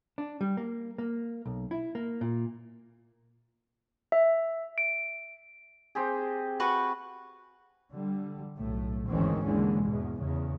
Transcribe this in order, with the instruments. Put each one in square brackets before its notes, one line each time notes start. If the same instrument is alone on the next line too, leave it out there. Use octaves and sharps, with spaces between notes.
[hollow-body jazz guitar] D4
G3
A#3
A#3
B1
E4
A#3
A#2
[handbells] E5
D7
[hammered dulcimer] C4 G4 G#4
[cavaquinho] F#4 B4 C#6
[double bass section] D3 G3
B1 A2 A3
G#1 D2 D#3 E3 C4 C#4
D#2 D3 E3 G#3
E2 G#2 B2
E2 C#3